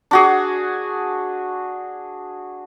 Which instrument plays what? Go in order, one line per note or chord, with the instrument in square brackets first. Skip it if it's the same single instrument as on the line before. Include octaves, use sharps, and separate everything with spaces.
[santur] D4 F#4 G#4